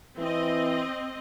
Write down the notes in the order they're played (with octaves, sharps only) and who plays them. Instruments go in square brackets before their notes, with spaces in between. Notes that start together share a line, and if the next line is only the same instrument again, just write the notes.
[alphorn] E3 [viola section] C4 D#5